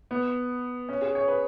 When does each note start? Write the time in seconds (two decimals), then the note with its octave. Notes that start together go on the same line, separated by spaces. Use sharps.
0.11 B3
0.89 C#4
1.02 G#4
1.15 C#5
1.28 B4